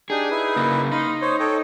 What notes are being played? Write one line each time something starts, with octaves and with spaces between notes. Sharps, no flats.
D4 D#4 G4 G#4
D#4 E4 B4
C#3 A#3
D#4 F5 B5 C6
C5 C#5
A4 C#5 G5